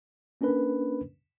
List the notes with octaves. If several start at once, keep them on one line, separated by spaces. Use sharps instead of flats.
A#3 C#4 D4 A#4 B4